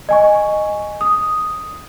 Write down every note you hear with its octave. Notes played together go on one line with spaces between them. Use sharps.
D#5 G#5 C#6
D#6